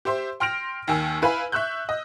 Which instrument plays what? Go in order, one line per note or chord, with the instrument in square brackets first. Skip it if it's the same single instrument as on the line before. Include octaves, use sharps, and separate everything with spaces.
[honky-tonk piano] G4 C5 E5 C6
G5 C6 F6 A#6 D7 F7
D#2 D#3 G#5 E6
E4 B4 F5 G#5 B5
E5 C#6 E6 F#6 G6
D#5